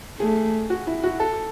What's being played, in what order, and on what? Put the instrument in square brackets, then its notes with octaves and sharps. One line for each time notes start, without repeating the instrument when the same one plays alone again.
[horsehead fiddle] A3 [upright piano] G#4
[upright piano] F#4
E4
F#4
A4